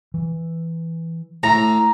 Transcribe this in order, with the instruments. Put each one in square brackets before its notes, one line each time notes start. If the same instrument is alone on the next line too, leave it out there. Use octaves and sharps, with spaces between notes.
[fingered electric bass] E3
[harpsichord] A2 [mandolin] A#5